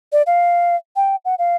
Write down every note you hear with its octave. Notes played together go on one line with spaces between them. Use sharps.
D5
F5
G5
F#5
F5